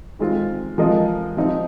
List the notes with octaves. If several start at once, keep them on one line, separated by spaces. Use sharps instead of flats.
D#3 G#3 C4 F4
F3 G#3 F4 A#4 D#5
F3 C4 D#4